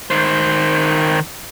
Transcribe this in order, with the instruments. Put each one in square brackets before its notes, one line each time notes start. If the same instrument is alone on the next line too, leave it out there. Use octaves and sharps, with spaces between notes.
[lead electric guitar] D#3 C5